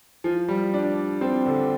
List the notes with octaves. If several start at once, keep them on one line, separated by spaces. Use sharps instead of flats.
F3
G3
D4
C4
D3